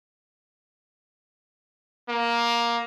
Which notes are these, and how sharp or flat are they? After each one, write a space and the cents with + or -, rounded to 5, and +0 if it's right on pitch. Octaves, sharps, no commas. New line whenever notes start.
A#3 +10